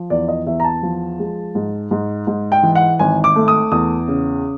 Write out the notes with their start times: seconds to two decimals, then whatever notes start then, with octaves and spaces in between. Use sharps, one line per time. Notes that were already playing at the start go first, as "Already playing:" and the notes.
Already playing: F3
0.10 E2 D5
0.28 D#5
0.47 E2 E5
0.60 A#5
0.64 A5
0.83 F3
1.19 G#3
1.55 G#2
1.91 G#2
2.27 G#2
2.52 G5
2.63 E3
2.75 F#5
2.99 G#1 G#5
3.24 D6
3.36 A3
3.48 D#6
3.72 E2 D#6
4.08 C#3